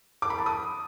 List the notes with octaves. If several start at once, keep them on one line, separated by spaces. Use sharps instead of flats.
D6
B5
A5
D#6